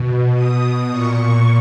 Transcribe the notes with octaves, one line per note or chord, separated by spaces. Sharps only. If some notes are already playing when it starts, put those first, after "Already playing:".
Already playing: B2
D#6
A#2 C#6